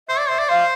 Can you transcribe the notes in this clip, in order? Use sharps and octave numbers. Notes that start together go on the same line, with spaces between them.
C5 E5
D5
C5 E5
D5
C5 F5